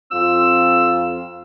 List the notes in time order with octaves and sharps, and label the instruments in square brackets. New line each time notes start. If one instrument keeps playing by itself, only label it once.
[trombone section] F2 C4 F4 [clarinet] E6